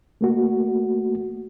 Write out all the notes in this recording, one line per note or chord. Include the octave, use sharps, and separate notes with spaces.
A3 A#3 F#4